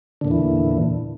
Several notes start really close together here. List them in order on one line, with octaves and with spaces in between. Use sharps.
D3 A#2 E2 E3